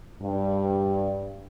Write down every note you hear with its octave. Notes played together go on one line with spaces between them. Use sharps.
G2